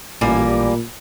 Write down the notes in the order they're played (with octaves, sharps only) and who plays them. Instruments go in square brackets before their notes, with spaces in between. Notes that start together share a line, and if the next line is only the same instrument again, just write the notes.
[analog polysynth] A1 [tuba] A#2 [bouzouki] G3 A#3 G#5